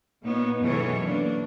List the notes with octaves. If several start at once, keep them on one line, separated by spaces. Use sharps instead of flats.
A#2 B3 D#4 C#5
F#2 B2 E3 G#3 A4 C#5
A#3 D4